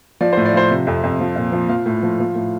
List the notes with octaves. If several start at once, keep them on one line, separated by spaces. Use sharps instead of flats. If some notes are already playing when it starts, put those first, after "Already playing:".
F3 D5
A2 C5
D5
F3 C5
C3
F2
F2
F3
A#2
F3
F3 F5
A2
F3
F3
A2